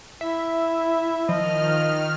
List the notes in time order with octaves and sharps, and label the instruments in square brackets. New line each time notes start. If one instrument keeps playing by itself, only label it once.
[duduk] E4 [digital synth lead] E5
[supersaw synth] D#3 F6 [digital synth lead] F3 [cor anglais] D#5